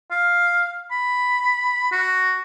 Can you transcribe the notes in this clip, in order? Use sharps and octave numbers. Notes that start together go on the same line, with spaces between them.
F5
B5
F#4